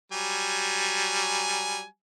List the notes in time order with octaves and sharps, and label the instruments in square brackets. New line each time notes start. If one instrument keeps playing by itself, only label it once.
[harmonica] F#3 G3 G#5